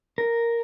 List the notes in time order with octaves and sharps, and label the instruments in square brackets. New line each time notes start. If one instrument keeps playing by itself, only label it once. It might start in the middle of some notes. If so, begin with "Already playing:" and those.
[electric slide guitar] A#4